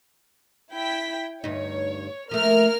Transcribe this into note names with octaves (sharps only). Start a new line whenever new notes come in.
E4 G5 B6
D2 G2 D#4 C#5
F3 A3 A#3 A#4 F6